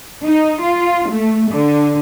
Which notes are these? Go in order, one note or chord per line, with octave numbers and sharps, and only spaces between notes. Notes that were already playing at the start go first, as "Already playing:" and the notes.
D#4
F4
A3
D3